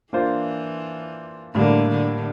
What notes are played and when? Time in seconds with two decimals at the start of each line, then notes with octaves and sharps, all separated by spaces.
0.13 E3 A#3 D4 F4 C5
1.54 A2 D3 G3 A#3
1.90 D3